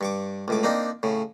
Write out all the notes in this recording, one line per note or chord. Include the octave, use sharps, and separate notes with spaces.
G2 C#6 D6
C#2 A2 D6
A#3 C4 D4 D#4
A2 C#3